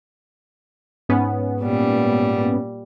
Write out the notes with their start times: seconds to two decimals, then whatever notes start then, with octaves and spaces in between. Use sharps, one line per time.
1.09 G#2 B3 C#4
1.62 A#2 G3